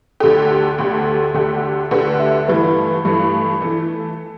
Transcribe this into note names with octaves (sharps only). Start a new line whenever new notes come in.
D2 D3 A3 G4 A4
D2 D3 A3 G4
D2 D3 A3 G4
D2 D3 A3 G4 B4
E5
G2 E3 A3 B4
G2 E3 A3
E3 A3